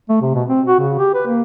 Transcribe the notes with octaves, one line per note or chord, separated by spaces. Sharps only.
A3
C3
B2
C4
F#4
C#3
G4
B4
A#3